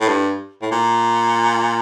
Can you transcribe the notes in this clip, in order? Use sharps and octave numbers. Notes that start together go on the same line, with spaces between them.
A2
G2
A2
A#2